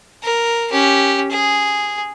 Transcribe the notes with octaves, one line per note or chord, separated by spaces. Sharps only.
A#4
C#4 G4
G#4